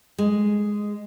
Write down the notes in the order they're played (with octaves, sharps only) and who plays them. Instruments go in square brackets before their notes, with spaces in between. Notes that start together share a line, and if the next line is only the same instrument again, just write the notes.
[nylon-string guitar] G#3